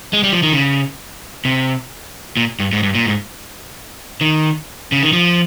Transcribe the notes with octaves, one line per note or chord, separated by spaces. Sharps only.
G#3
G3
F3
D#3
C#3
C3
A#2
G2
G#2
G2
A#2
G#2
D#3
C#3
D#3
F3